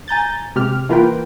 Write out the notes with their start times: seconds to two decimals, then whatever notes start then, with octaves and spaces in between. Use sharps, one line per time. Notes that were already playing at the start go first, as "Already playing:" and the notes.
0.08 G#5 A#5 G6 A6
0.56 C3 G#3 G4 F6
0.89 E3 A#3 F4 A#4 B4 G5